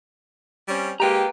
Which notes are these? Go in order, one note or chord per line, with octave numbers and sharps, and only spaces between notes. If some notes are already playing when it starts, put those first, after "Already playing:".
G3 C4 C#4
G#3 A#3 G4 B4 G5 A#5